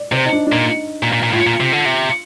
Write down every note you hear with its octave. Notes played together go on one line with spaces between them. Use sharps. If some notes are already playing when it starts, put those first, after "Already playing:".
Already playing: D5
C3 C5
D#4
D4
D4
A#2 D#4
A#2
A#2
A#2
A2 F4
A#2
C3
D3
C3